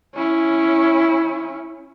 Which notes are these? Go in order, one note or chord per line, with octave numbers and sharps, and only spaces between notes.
C#4 E4